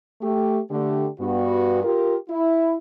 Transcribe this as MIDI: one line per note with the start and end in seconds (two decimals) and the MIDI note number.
0.21 0.59 57
0.21 0.59 67
0.70 1.07 50
0.70 1.07 57
0.70 1.07 67
1.19 1.81 43
1.19 1.81 59
1.19 1.81 66
1.84 2.15 65
1.84 2.15 67
1.84 2.15 70
2.28 2.75 64